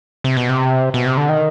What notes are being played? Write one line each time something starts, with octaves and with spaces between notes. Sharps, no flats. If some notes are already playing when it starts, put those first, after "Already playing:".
C3
B2
C3
B2
C3
D3
D#3